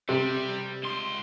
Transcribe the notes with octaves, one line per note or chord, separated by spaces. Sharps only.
C3 G3
C#2 C6